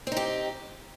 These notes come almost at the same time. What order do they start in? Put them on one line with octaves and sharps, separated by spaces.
C4 D#4 G4